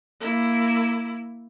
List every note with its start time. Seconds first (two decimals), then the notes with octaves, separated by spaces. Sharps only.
0.21 A#3 E4